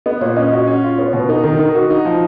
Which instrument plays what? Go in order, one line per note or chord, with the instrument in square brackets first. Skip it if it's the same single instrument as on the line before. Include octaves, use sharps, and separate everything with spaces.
[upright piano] B3 [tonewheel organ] D#5
[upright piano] A#2 [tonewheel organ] C#5
[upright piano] C#4 [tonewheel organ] D#5
[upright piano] F#4
C#4
F4
[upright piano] B3 [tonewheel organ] C#5
[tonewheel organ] C#5
[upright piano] B2
[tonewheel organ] B4
[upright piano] D#4 [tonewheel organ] A#4
[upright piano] D#3 [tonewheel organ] A#4
[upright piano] D#4 [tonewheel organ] A#4
[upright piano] F#4
D#4
F3